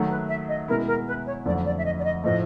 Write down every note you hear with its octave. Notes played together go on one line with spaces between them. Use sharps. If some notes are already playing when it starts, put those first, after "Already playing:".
Already playing: D#3 F#3 A3
B4
E5
D#5
B2 G#3 B3 E4 A#4
A#4
B4
C#5
F2 D3 F#3 A3 D5
D5
E5
D#5
D5
D#5
A2 F3 A3 D#5